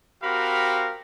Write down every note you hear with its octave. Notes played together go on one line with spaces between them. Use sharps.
C4 F#4 G4 A#4 F5 B5